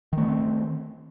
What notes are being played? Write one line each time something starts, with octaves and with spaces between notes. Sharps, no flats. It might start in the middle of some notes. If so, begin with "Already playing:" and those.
D#3 A3 B3 C4